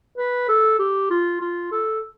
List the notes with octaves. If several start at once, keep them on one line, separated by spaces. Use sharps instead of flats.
B4
A4
G4
F4
F4
A4